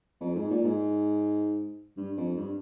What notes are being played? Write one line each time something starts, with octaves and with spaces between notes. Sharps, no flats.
F2
G#2
A#2
G#2
G2
F2
G2